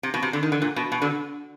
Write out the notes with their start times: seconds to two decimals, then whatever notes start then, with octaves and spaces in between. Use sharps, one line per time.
0.03 C3
0.14 B2
0.22 C3
0.33 D3
0.43 D#3
0.52 D3
0.62 A#2
0.76 B2
0.92 B2
1.02 D3